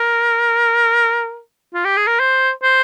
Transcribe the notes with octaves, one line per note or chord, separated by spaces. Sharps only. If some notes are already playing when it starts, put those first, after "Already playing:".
Already playing: A#4
F4
G4
G#4
A#4
C5
C5